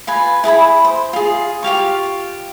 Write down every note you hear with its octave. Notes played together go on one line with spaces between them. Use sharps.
F4 B4 G#5
E4 G#4 A5 B5
C5
F4 G#4
F4 G4 F5 C#6